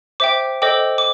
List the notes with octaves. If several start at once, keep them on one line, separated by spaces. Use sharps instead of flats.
C5 E5 G5 D6
A4 C5 D#5 G5 D6
D6